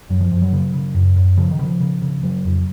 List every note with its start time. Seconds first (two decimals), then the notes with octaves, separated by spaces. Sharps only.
0.10 F#2 F#3
0.21 F3
0.31 F#2 F3
0.42 F#3
0.53 C#3
0.74 C#3
0.95 F#2
1.16 F#2
1.38 C#3 F3
1.51 D#3
1.59 C#3 F3
1.80 C#3
2.02 C#3
2.23 C#3 F#3
2.45 F2